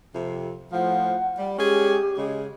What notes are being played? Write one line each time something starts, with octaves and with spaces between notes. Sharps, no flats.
F2 C3
A2 F3 F#5
G3
G#3 C#4 G4 G#4
C#3 G#3